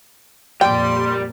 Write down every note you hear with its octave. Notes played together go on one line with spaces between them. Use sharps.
F2 A#2 G3 A#3 D5 G5 C6